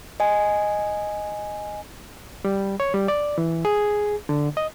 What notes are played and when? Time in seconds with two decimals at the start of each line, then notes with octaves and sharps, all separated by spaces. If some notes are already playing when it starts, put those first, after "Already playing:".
0.20 D#5 G#5
2.45 G3
2.80 C#5
2.94 G3
3.08 D5
3.38 E3
3.65 G#4
4.29 D3
4.57 D#5